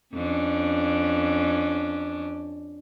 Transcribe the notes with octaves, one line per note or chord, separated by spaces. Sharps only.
F2 C#4 D4